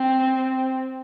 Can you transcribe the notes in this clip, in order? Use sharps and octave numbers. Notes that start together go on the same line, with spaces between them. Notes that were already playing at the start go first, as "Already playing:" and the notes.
Already playing: C4